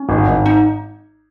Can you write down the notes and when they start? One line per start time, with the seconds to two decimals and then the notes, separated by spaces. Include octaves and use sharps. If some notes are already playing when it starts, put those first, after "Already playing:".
Already playing: C#4
0.09 G#1
0.27 G#1
0.46 D#4